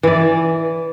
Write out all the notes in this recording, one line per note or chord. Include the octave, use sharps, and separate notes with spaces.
E3 D5